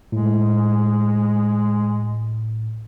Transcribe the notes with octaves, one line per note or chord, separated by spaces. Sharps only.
A2 G#3